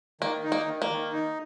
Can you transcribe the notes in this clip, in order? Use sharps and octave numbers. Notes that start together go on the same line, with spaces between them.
D#3 A#3
D#4
A#3
D#3
A#3
D#3
D#4